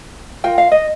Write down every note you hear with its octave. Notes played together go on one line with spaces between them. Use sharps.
F4 A#4 G5
F5
D#5